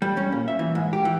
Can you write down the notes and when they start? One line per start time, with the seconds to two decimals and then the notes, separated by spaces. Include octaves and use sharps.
0.02 G3
0.17 C#4
0.32 A#2
0.48 E5
0.59 E3
0.75 G#2
0.93 G4
1.05 E3